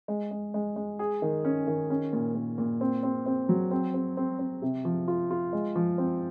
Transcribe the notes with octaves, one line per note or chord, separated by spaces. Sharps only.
G#3
G#3
G#3
G#3
G#4
D#3
C#4
D#3
C#4
A#2
A#2
A#2
C4
C4
C4
F#3
C4
C4
C4
C4
C3
F3
F4
F4
G#3
F3
C4